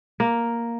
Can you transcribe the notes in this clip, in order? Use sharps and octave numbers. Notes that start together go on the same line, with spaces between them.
A#3